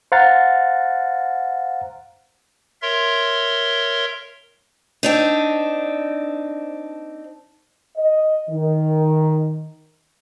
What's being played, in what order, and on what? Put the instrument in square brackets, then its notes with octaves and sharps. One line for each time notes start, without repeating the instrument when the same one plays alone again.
[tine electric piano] C5 F5 F#5 A#5 A6
[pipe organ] A#4 C#5 E5 C6
[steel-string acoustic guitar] C4 D4 D#4
[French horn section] D#5
D#3